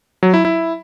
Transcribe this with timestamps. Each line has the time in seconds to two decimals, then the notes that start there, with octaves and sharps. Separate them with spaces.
0.23 F#3
0.34 E4
0.45 E4